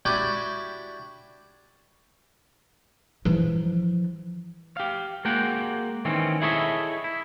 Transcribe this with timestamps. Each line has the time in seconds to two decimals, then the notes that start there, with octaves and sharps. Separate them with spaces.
0.05 D4 E4 F#4 G4 G5 G#5
3.25 E3 F3
4.77 G4 F5
5.25 G#3 A#3 F#4 F#5 G5
6.05 D#3 E3 C4 C#4
6.41 E4 G#4 A4 C#5 D#5 E5
7.04 E4